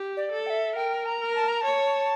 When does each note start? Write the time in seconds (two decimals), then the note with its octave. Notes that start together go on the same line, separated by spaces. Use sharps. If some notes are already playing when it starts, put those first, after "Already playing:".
Already playing: G4
0.17 D5
0.32 A4
0.47 G5
0.50 E5
0.76 A#4 G5
1.06 A#5
1.20 A#4
1.35 A5
1.48 A#5
1.61 C#5 A5